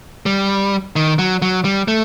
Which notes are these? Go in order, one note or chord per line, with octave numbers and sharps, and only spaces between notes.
G3
D#3
F#3
F#3
G3
A3